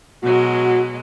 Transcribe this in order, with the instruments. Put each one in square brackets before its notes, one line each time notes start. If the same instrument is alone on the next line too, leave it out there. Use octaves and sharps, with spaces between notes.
[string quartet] B2 F#3 G#3 [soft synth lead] F#4